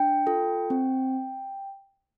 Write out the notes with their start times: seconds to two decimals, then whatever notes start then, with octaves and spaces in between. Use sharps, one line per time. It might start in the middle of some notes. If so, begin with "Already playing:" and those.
Already playing: D4 G5
0.27 F4 A4
0.70 C4